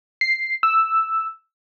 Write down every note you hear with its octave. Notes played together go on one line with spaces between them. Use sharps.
C7
E6